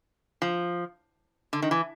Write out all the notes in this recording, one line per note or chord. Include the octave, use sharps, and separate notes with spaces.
F3
D3
D#3
E3